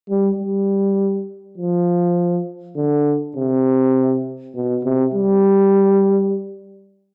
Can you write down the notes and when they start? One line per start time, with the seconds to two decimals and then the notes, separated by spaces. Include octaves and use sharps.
0.10 G3
0.39 G3
1.58 F3
2.77 D3
3.36 C3
4.55 B2
4.85 C3
5.14 G3